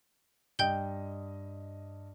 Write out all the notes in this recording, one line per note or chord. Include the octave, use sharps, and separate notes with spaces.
G2 D#5 G5 G6 G7